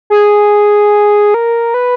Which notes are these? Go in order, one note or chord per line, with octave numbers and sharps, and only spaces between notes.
G#4
A#4
B4